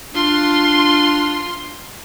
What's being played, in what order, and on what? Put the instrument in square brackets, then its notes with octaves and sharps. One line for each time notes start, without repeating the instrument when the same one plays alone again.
[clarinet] D4 [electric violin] F4 C6